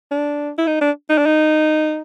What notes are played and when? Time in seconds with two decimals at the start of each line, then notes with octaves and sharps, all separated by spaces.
0.11 D4
0.58 E4
0.67 D#4
0.81 D4
1.10 D#4
1.18 D4
1.26 D#4